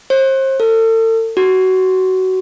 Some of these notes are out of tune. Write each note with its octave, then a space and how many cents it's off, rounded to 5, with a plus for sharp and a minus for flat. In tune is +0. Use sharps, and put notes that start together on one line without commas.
C5 +35
A4 +40
F#4 +20